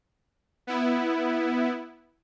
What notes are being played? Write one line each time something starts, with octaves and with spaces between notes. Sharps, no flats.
B3 E4